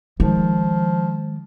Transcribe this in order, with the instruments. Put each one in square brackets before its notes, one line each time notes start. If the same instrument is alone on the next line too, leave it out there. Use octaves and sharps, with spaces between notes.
[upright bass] D#3 G#3 [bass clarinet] F3